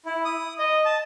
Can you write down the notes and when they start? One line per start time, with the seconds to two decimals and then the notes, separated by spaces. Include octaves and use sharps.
0.05 E4
0.25 D#6
0.59 D#5
0.85 A5